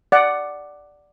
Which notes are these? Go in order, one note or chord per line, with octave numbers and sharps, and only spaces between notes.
D5 F#5